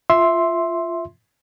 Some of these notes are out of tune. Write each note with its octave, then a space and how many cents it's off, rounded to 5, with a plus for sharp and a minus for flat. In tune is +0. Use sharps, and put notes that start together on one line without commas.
F4 -10 E5 +0 C6 +5